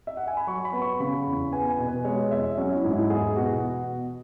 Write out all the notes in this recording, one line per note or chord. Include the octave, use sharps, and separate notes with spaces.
E5
F#5
G#5
B5
F#3 C#6
B5
B3
C#6
C#3 B5
E2
B3 G#5
G#5
B2
B4
G#3 C#5
E2 E5
F#3 C#4
E4
G#2
E4
E2 G#4
B2 F#4